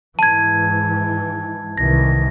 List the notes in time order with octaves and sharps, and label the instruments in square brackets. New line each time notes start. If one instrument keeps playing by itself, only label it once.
[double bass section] G#2 E3 [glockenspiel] A5 G#6
[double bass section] C2 D#3 E3 [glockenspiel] A#6